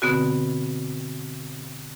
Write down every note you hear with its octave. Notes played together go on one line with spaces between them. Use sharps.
B2 D3 B3 C4 F#4